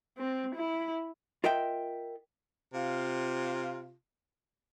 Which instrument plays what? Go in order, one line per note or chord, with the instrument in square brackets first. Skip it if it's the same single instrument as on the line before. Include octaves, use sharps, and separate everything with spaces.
[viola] C4
E4
[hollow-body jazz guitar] F4 A#4 D#5 E5 G5
[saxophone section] C3 F4